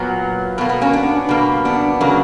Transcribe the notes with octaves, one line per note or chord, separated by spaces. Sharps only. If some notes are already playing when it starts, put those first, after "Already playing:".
Already playing: A#2 F#3 A#3 B3
B2 A#3 B3
B3
A#3 C#4
B3 D4
B2 G3 A#3
B3 D4
C#3 F#3 A#3